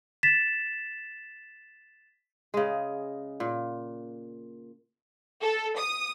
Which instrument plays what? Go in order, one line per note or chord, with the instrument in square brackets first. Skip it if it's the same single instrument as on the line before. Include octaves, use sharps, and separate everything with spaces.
[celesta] A6 B6 E7
[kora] C#3 G#3
A#2
[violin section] A4
D#6